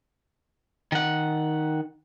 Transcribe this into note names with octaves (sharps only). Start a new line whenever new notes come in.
D#3 F#5